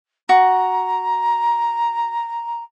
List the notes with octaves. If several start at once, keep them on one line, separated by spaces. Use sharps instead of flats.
F#4 A#5